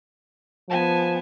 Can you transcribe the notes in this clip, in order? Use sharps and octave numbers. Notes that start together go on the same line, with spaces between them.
F3 B3 G#5 A5